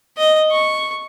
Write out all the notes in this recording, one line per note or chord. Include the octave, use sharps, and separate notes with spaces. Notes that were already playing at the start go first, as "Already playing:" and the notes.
D#5
C#6